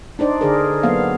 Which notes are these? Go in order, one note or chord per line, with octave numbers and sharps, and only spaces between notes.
D4 D#4 C5 D5
D3 G#4 A#4
F#3 A#3 B3 F5